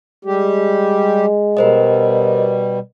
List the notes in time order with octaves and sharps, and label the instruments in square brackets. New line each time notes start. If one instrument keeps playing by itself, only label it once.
[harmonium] G3 G4 [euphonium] G#3
[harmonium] B2 G3 [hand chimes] A#4 C5 D#5